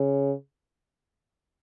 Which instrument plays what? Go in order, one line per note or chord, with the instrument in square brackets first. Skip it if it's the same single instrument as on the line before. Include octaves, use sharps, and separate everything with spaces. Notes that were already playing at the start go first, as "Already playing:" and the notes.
Already playing: [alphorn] C#3